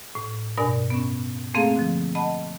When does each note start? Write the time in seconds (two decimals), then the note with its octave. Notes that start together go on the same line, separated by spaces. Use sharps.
0.15 A2
0.57 G2 B2 D4 A#4 D5 G#5
0.90 B3 C#4
1.54 A3 A#3 C4 G#4 A4 F5
1.76 D3 F3
2.15 D#5 F#5 A5 B5